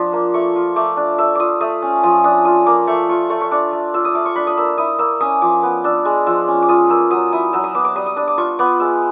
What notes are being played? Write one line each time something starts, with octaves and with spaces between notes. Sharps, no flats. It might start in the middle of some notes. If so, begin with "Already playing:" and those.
Already playing: F3 D4
A#3
A3 C#6
F4
A3 D6
D4
A3 E6
F4 D6 D#6
A3 D#6
C#4
F3 D#6
D4 D#6
F4 D#6
A#3 D6
A3 C#6
F4 C#6
A3 C#6
C#6
D4 D6
A3
F4 E6
D#6
A3 D6
C#6
D4 B5
D#6
A#3 E6
E4 D#6
A#3 E6
C#4 D#6
F3 D6
B3
D4 E6
G#3
F3 E6
C#4
D6
F4 D#6
A#3 E6
F#3 D#6
E4 D#6
F#3 E6
D#6
B3 D6
D6
G3 D#6
D#6
D4 D#6
D6
F4 C#6
B3 D6
G#3 E6